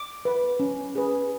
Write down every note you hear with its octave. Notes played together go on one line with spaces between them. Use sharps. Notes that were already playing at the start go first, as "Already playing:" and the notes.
Already playing: D6
B4
C#4
G#4 B4